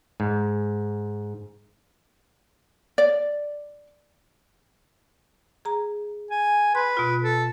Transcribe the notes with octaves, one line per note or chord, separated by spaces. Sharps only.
G#2
D5
G#4 A#5
G#5
B4 C6
B2 F4
A4